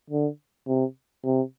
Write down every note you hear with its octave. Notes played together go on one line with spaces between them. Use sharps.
D3
C3
C3